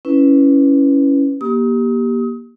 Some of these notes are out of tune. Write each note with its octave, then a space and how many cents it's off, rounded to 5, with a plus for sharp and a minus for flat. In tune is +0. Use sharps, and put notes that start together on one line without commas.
C#4 +0 E4 +0 B4 +0
A#3 +30 G4 +0 D#6 +35